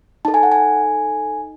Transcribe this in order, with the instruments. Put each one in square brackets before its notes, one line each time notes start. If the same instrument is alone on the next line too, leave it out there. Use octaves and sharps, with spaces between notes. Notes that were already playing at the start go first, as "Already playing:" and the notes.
[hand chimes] D#4 A4 A5
G#5
F#5
G#5